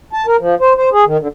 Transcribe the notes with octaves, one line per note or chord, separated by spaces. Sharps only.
A5
A#4
F3
C5
C5
G#4
D#3
D3